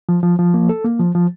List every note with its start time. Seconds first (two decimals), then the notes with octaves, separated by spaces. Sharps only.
0.09 F3
0.23 F3
0.39 F3
0.54 A#3
0.69 A4
0.84 A#3
0.99 F3
1.15 F3